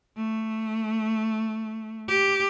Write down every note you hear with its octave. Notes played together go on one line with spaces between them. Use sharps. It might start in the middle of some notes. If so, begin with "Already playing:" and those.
A3
G4